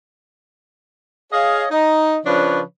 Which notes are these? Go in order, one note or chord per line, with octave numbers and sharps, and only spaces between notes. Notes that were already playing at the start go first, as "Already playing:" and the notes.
G#4 C#5 D#5 F5
D#4
C#3 F3 D4 B4 C#5